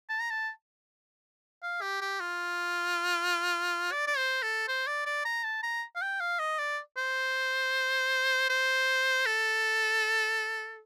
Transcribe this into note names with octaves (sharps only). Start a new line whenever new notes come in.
A5
A#5
A5
F5
G4
G4
F4
D5
D5
C5
A4
C5
D5
D5
A#5
A5
A#5
F5
G5
F5
D#5
D5
C5
C5
A4